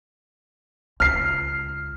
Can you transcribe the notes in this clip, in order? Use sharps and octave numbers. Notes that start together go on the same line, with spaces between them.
C#2 F6 C7